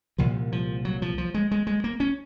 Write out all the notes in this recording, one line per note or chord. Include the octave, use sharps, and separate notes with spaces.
C2 A#2 F3
F3
F#3
F3
F3
G#3
G#3
G#3
A#3
C#4